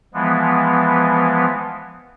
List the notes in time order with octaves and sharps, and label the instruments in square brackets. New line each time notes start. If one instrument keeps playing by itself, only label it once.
[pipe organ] E3 F3 G#3 B3